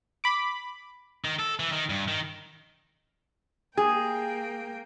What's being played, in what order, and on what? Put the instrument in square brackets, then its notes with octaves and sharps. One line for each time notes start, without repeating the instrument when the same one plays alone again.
[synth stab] B5 D6
[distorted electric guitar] D#3
A4
E3
D#3
G2
D#3
[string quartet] A#3 G5 [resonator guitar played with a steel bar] G#4